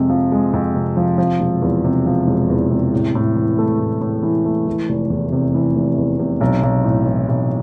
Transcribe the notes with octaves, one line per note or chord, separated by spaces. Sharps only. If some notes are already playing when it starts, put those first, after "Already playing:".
Already playing: F2 C3 G#3
F3
G#3
F2
C3
F3
F3
E1
E2
C3
F3
E1
E2
C3
A2
A2
E3
A3
A2
A2
E3
A3
E3
F1
E2
C3
E3
F1
E2
C3
B1
B1
A2
E3
B1